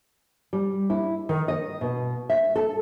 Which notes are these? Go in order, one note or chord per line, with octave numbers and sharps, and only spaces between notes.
G3
E4
D#3
D#5
B2
E5
A4